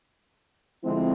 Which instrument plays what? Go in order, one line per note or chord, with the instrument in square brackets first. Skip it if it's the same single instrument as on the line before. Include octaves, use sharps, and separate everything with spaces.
[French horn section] D3 F3 G#3 C4 E4